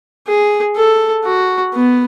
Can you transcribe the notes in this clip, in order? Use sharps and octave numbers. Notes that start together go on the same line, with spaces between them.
G#4
A4
F#4
B3